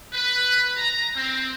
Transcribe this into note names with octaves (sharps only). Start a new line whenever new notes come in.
B4
A#5
C4